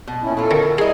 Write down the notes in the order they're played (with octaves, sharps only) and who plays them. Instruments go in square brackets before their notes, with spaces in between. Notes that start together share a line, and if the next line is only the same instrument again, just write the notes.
[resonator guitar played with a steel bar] B2
[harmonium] A#2 C#4 E4
[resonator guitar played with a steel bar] F#3 F4 [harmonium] A4
[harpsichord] D#3
[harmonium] G3 E4 [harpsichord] G#4 [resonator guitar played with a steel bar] A#4 D#5